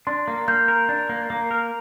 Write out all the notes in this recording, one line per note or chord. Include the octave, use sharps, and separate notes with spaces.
D4 C6
A#3
A#3 G6
A#4
D4
A#3
A#3
A#4